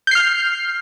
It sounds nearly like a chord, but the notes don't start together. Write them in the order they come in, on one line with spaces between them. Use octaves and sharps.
G6 C7 F6